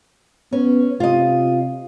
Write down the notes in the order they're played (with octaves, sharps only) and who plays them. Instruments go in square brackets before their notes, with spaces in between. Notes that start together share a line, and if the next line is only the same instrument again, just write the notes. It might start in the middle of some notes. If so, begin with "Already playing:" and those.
[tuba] B3 [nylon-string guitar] C#4
[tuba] C3 [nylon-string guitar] F4 D#5